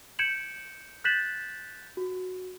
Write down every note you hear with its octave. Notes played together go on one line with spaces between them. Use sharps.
G6 G#6 C#7 D7 E7 F#7
F#6 G6 A6 B6 E7 F#7
F#4